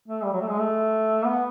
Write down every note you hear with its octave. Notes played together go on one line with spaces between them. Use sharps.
A3
G3
F#3
A3
G#3
A3
B3